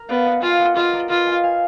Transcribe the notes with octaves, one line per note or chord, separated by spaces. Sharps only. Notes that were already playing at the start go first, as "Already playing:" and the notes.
Already playing: A#4
B3 D5 F5
D#5 F#5
F4 F5 G#5
D#5 F#5
F4 B4 D#5
A#4 D5
F4 B4 D#5
F5 G#5
F5 G#5